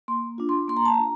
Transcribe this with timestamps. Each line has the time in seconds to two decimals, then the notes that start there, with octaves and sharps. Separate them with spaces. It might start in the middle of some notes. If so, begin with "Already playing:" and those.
0.08 A#3 C6
0.38 D4 F4
0.49 C6
0.68 A#3 C6
0.77 A#5
0.85 A5
0.94 D4 F4 A#5